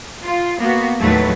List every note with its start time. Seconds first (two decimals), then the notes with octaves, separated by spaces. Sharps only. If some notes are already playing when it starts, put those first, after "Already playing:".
0.23 F4
0.58 A#3 B3 F#4
1.00 D#2 A2 F3 F#3 A3 B4